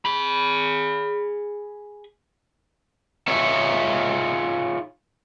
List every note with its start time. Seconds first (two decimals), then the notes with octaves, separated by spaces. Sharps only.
0.05 G#4 B5
3.28 D#4 F4 G#4 C#5 E5